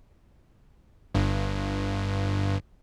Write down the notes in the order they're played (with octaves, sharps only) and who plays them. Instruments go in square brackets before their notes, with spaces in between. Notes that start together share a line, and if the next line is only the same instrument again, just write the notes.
[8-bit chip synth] G1 G2